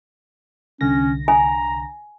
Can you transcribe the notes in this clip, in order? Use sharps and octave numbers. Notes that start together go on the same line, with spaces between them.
C2 D3 C#4 A#6
G#5 A#5